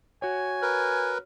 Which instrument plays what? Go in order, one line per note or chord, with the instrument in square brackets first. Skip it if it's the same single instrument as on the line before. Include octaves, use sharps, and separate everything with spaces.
[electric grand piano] F#4 C#5 [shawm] G#5
[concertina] A#4 B4